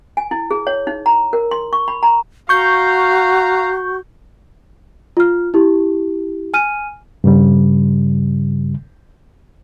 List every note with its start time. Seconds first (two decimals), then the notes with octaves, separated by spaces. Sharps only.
0.17 G#5
0.31 E4
0.51 G#4
0.67 C#5
0.87 D#4
1.06 A#5
1.33 A#4
1.51 C6
1.73 C#6
1.88 B5
2.03 A#5
2.49 F#4 F5 A#5 C#6 G6
5.17 F4 F6
5.54 E4 G4
6.54 G#5 F6 D#7
7.24 G2 C#3 G3